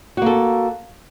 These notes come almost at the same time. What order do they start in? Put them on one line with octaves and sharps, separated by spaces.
F#4 A#3 A4